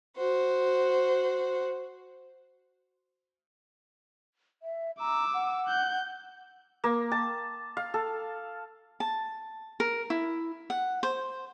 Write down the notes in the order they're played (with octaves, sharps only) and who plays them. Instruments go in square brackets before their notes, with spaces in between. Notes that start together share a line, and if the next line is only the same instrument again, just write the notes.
[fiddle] F#4 C5
[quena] E5
[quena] A#5 [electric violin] D6 E6
[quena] F#5
[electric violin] F#6 G6
[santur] A#3
A5
F5
A4
[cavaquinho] A5
A#4
E4
F#5
C5